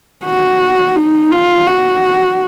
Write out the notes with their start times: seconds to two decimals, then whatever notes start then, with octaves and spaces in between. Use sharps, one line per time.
0.25 F#4
0.96 D#4
1.31 F4
1.67 F#4